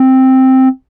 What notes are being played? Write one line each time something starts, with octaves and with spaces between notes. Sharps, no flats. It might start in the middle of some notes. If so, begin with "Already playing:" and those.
Already playing: C4